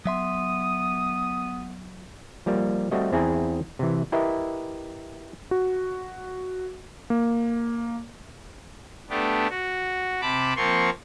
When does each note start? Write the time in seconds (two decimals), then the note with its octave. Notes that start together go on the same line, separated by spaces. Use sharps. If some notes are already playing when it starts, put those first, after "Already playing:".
0.06 F#3 B3 E5 C6 D#6
2.46 F3 G3 A#3
2.91 G3 A3 C4 F#4 D#5
3.12 E2 C4 E4 G#4 G#5 A#5
3.79 C3 E3
4.12 E4 G4 A#4 B4 D#5 E5
5.51 F#4
7.10 A#3
9.09 A3 B3 D4 G4
9.50 F#4
10.21 C3 A5 B5 D6
10.56 F3 A#3 C4 F4 C6 C#6